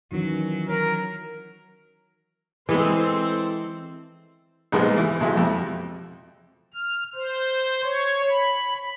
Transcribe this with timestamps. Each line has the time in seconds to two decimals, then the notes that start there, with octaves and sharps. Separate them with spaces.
0.12 D#3 E3 F#3 C#4
0.69 A#4 C#5
2.69 E3 G#3 C4 A4 C5
4.72 A#1 G#2 G3 G#3 B3
4.97 E3
5.20 B1 G#3 F#4 E5
5.35 F2 G3
6.74 F6
7.15 C5
7.84 C#5
8.30 B5